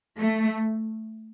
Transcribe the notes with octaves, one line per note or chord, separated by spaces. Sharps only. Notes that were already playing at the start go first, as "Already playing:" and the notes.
A3